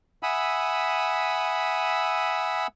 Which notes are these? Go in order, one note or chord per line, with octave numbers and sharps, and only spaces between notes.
E5 F#5 G#5 B5 D#6 E6